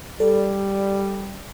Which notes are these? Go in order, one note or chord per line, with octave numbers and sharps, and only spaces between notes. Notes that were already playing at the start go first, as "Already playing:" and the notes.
G3 A4 D5